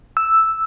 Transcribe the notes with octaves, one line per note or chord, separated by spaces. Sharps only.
E6